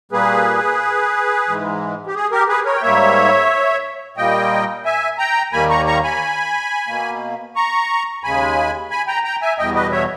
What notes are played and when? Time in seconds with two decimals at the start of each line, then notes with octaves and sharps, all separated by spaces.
0.12 A#2 G3 A#3 G#4 B4
1.48 G#2 E3 G#3
2.07 G4
2.15 G#4
2.31 G4 A#4
2.48 G#4 B4
2.65 A#4 C#5
2.76 G5
2.82 G#2 G3 A#3 C#5 E5
4.17 A#2 G3 A#3 D#5 G5
4.85 E5 G#5
5.18 G5 A#5
5.52 D#2 D#3 G3 A#3 G#5 B5
5.69 A#5 C#6
5.86 A#5 C#6
6.04 G#5 B5
6.87 B2 A#3
7.56 A#5 C#6
8.24 D#2 C#3 G#3 G#5 B5
8.90 G#5 B5
9.07 G5 A#5
9.24 G5 A#5
9.41 E5 G#5
9.58 E2 B2 G3 D#5 G5
9.75 B4 D#5
9.91 C#5 E5